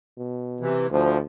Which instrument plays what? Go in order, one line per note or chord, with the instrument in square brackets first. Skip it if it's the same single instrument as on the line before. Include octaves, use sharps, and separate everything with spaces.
[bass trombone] B2
[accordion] C3 E3
[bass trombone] D2 [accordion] F3